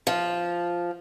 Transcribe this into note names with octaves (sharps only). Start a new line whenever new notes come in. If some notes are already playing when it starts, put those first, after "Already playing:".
F3